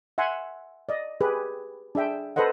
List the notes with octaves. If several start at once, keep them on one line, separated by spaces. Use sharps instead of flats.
E5 F#5 G#5 C6
D5 D#5
G4 G#4 B4
D4 G#4 E5 G5
A4 B4 C5 D#5 F#5